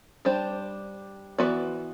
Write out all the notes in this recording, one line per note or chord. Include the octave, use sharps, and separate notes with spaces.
G3 D4 G4 C5
E3 B3 F#4 B4 D5